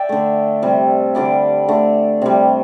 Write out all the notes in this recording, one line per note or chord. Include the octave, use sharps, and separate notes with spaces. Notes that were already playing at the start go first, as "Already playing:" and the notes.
Already playing: D5 E5 G5
D3 A3
C3 G3
D3 G3 D5
D3 A3
C3 G3